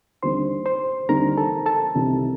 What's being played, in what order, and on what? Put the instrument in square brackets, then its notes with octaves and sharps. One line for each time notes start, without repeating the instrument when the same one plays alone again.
[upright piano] D#2 D3 G3 A#3 D#4 [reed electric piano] C5 C6
[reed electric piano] C5 C6
[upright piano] D#2 D3 G3 A#3 D#4 [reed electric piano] A#4 A#5
[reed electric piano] A4 A5
A4 A5
[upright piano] C2 C3 D#3 A#3 D#4